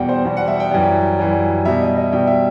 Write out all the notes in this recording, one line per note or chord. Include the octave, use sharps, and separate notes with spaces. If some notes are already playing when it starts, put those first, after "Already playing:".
Already playing: E2 B2 G3 F#5 G5
C5
E2 B2 G3
F#5
E5
G5
F#2 E3 G3
F#2 E3 G3
B2 G3 E5
D#5
D#5
B2 G3 G5
E5